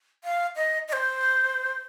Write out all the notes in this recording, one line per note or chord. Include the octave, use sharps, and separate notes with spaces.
F5
D#5
D#5
C5